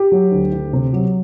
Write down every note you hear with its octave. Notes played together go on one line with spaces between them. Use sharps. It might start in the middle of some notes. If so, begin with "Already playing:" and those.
Already playing: G4
F#3
D2
D2
C3
F#3